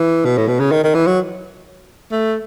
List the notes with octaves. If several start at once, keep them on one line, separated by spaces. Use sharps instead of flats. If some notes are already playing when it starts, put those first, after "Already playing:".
Already playing: E3
B2
A2
B2
C#3
D#3
D#3
E3
F#3
A3